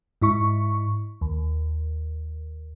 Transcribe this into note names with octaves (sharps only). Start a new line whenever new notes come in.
G#2 E4 C#6
D#2